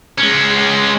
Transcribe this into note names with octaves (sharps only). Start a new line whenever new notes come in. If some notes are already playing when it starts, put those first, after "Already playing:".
G#3 C#4